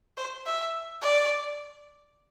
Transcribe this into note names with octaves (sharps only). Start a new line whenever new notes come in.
C5
E5
D5